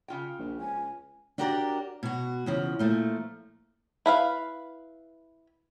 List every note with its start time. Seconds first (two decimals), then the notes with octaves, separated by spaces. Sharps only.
0.08 C#3 F4 G5
0.39 A#1
0.60 C#2 G#5
1.38 D4 F#4 G4 A#4 B4 D5
2.03 B2 F#4
2.46 E2 C#3 F3
2.79 A#2 F3 A3
4.06 E4 B4 F5